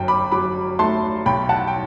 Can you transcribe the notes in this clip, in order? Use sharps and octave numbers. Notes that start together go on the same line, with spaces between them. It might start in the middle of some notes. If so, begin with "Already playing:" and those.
Already playing: G1 F#2 G5
B5 D6
F#3 B5 D6
A3 A5 C6
B1 G5 B5
F#5 A5
G5